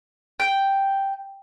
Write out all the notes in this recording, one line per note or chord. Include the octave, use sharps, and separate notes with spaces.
G5